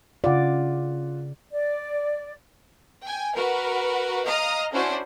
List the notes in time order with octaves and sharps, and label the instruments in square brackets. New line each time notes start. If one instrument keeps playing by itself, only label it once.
[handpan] C#3 D5 [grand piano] F4 F#5
[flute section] D5
[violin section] G5 G#5
F#4 A#4 B4
D#5 F5 A#5 D#6 F6
C#4 D4 E4 F#4 C5